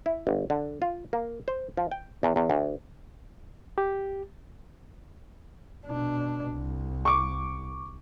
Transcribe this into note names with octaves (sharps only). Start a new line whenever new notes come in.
E4
G1
D3
F4
A#3
C5
F3
G5
E2
E2
D2
G4
B2 D4
C2
C#6 D6